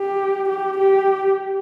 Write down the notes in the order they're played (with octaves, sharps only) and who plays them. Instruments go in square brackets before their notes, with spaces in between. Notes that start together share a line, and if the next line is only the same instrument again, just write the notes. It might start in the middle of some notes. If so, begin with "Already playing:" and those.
Already playing: [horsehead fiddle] G4
G4
G4